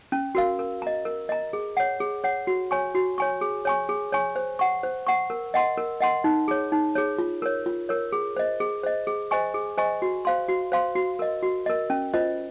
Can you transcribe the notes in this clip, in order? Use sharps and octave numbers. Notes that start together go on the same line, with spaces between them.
C#4
F#4 A#4 F5
A#4
D#5 A#5
A#4
D#5 A#5
G#4
C#5 F#5
G#4
C#5 F#5
F#4
C#5 G#5 C#6
F#4
C#5 G#5 C#6
G#4
C#5 G#5 C#6
G#4
C#5 G#5 C#6
C5
F#5 C#6
C5
F#5 C#6
A#4
D#5 F#5 C6
A#4
D#5 F#5 C6
D#4
G#4 C#5
D#4
G#4 C#5
F4
A#4 C#5
F4
A#4 C#5
G#4
C5 D#5
G#4
C5 D#5
G#4
C5 D#5 G#5 C#6
G#4
C5 D#5 G#5 C#6
F#4
C5 F5 C6
F#4
C5 F5 C6
F#4
A#4 D#5
F#4
A#4 D#5
C#4
F4 C5 D#5